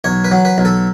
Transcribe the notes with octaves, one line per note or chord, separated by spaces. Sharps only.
B1 C#5
B4
F#3
B4
B1
A4